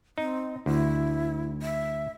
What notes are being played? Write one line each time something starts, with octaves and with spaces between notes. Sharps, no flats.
C4 D#4
D2 E4
E5